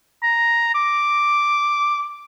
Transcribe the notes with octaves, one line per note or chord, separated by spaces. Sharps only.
A#5
D6